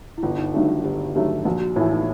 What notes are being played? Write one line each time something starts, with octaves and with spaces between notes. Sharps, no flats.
E4
G1 F4
D#4
G2 D#3 F#3 A3 D#4
F4
G1 G4
G2 D#3 F#3 A3 G4
A#1 F#4
F#4
A2 E3 A3 F4
D#4